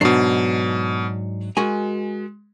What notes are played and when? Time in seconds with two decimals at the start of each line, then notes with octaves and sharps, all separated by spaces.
0.01 G#2 B2 F#3 D4 C7
1.57 G#3 F#4 A#4 G#5